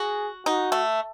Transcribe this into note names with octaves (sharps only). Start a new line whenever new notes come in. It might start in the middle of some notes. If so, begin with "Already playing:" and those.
Already playing: F#4 G#4
D#4 F#4
A3